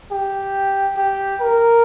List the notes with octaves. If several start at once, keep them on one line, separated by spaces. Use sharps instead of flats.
G4
G4
A#4